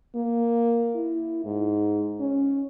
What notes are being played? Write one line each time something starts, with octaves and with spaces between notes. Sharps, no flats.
A#3
E4
G#2
C#4